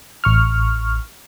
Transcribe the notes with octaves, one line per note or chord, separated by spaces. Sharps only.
A1 C#6 F6